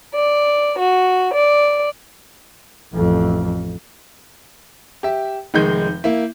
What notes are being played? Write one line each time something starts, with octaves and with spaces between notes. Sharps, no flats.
D5
F#4
D5
A1 F2
G4 E5
F1 D#3 G#3 G6
A#3 E4